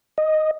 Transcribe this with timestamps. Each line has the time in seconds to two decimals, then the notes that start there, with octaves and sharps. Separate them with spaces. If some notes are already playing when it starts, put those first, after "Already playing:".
0.18 D#5